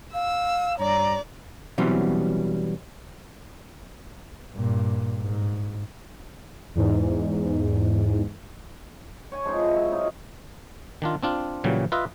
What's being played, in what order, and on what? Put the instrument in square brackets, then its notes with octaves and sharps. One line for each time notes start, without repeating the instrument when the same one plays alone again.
[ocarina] F5 [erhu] E6
[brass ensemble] G2 A#5 [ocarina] C#5 [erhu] D5
[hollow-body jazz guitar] B2 E3 F#3 G3 C4 C#4
[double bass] G2 A#2
G#2
[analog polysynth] E2 G#2
[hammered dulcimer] C#5 G#5
F3 G#3 C4 D#4
E4
F#3
F#3 D#4 F4 C#5
[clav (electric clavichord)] D#3 D4 F4
C4 D4 F4
A#2 C#3 E3 F#3 G3
F4 B4 D#5 E5